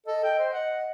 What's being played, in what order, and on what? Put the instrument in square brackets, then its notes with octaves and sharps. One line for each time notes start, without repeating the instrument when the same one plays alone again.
[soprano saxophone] A4 [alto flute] D#5
[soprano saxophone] G5
C5
[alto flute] D#5 [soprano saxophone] F#5